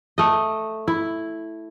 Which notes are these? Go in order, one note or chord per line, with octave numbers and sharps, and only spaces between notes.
A3 D#5
E4